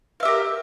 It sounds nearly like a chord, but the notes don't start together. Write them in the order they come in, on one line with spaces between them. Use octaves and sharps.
F5 E5 G4 A#4